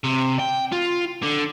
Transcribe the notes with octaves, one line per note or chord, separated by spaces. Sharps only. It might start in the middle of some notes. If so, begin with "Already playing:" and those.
C3
G5
F4
D3